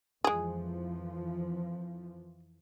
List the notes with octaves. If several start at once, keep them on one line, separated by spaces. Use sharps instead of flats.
F2 E3 F3 G#3 G#4